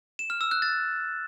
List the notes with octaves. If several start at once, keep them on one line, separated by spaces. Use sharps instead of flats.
E7
F6
E6
F#6
A6